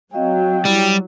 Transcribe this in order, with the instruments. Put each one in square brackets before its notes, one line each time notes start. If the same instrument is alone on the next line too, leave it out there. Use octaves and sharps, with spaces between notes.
[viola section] F#3 [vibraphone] C4 D#5 F5 [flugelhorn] G5
[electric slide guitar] G3 [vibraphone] E4